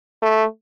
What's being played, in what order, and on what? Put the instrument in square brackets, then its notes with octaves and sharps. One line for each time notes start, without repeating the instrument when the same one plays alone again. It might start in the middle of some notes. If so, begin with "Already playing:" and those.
[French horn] A3